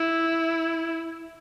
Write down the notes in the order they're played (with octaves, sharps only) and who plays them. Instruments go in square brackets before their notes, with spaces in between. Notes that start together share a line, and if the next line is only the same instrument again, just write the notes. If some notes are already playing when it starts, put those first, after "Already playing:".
Already playing: [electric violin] E4